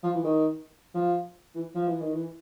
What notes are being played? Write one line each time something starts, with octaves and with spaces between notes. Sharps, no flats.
F3
E3
D#3
F3
E3
F3
E3
D#3
E3